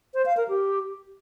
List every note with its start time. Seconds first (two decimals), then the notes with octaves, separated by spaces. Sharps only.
0.14 C5
0.26 F5
0.37 A#4
0.48 G4